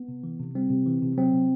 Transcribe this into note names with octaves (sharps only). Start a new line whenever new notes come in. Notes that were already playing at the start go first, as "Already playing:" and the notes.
Already playing: B3
C3
E3
C3
G3 C4
C3
E3
C3
F#3 C4
C3